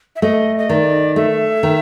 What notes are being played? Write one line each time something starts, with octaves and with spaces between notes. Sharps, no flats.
E5
A3 D#5
D#5
D#3 D5
A3 E5
D#3